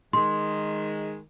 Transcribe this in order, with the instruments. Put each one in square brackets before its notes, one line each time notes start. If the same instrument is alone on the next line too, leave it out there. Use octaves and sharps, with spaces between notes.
[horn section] D#3 G#3 [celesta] C6